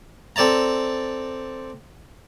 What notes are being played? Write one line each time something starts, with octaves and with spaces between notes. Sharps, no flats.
C4 A4 D5 A5 A#5